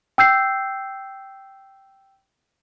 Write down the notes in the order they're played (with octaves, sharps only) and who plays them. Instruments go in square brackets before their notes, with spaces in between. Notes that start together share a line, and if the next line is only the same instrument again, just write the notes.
[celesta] G5 E6 G6 C7